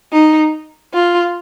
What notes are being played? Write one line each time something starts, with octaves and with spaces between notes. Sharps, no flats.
D#4
F4